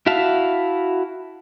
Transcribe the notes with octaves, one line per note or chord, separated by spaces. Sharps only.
E4 F#4 E5 F5 A5